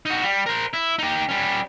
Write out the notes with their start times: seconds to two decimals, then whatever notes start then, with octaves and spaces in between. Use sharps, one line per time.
0.06 D#4 F#4
0.23 G3
0.46 A#4 C5
0.73 E4
0.99 D#4 G4
1.29 G3 C#4